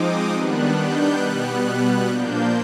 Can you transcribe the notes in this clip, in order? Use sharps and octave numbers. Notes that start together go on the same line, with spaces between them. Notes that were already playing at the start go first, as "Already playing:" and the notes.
Already playing: F3 G#3 C4 D#4 D6 D#6
D#3 G3 B3 D4 F#6
G6
B2 G3 B3 F#6
A#2 F3 A#3 D4 G6